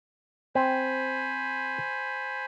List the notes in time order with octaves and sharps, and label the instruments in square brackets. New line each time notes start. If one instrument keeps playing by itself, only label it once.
[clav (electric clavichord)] C4 [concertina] C5 G#5 B5